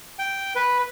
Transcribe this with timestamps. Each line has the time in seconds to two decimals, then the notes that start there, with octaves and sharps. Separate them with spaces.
0.19 G5
0.55 B4